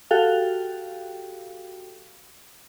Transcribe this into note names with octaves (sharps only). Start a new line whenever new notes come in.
F#4 G4 A4 F5 G5